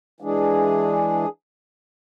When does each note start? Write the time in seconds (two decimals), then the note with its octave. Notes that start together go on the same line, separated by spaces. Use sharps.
0.20 E3 G#3 D4 G#4